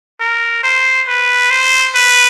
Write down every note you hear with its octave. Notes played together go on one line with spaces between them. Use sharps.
A#4
C5
B4
C5
B4